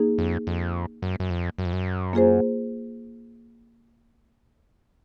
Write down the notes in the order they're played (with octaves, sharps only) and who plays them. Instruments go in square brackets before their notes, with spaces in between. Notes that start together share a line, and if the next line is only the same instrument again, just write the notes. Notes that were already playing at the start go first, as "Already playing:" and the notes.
Already playing: [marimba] A#3 D#4 G#4
[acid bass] F2
F2
F#2
F#2
F2
F#2
F2
F#2
[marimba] A#3 F4 G#4 C5